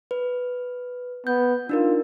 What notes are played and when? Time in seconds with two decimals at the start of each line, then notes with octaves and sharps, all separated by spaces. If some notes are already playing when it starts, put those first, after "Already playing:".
0.11 B4
1.27 B3 G6
1.69 D4 D#4 F4 A#4